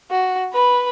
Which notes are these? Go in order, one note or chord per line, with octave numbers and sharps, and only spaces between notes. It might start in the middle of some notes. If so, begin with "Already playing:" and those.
F#4
B4 B5